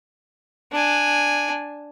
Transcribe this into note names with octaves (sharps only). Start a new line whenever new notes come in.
D4 G#5